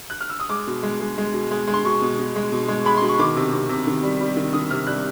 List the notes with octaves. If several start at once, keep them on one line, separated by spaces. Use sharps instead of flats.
F#6
F6
E6
D#6
G#3 D6
B2
G#3
G#3
G#3
B2
G#3
G#3
C6
B2 C#6
B2
B2
G#3
B2
G#3
G#3 B5
B2 C6
C#6
D#3 D6
C3
C3
C3
D#3
G3
G3
D#3
D#3 D#6
C3 F6
G3 F#6